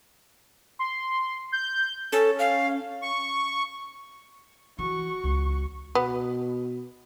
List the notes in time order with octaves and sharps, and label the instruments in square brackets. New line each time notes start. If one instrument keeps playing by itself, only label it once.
[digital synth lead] C6
G6
[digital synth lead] C#4 [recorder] A4
[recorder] F5
[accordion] C#6
[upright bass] E3 [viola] F#4 C#6
[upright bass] C#2
[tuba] B2 [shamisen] B3